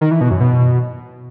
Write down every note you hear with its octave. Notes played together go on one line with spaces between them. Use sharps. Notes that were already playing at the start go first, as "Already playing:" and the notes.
D#3
E3
B2
F#2
B2